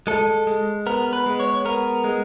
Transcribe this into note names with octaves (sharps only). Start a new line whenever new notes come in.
G#3 A4
G#3
B3 A#4
B4
G#3
C#5
B3 A#4
G#3